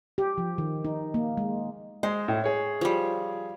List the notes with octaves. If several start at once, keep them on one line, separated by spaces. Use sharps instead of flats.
G4
F3
D#3
D#4
A#3
G#3
G#3 C5
A2
G#4 C#5
F3 G3